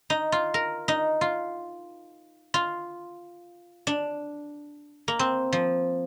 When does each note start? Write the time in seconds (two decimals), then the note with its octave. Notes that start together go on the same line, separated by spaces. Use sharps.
0.10 D#4
0.32 F4
0.54 A#4
0.88 D#4
1.21 F4
2.54 F4
3.87 D4
5.08 A#3
5.19 C4
5.52 F3